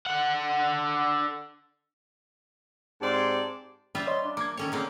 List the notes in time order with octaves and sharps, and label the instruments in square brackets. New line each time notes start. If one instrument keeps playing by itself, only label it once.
[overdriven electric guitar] D3 F#5
[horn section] G#2 C4 G4 D5 A5 C6
[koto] G3 F4 E5
[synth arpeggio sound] C#5 D#5 [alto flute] C6
[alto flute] D4
[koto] A#3 [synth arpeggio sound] D6 G#6
[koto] D#3 C#4 C#5 [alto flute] A4
[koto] D3 A#3 C4 [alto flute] G#4